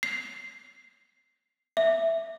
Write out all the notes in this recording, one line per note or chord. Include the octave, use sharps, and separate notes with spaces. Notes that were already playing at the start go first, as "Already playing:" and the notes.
C7
E5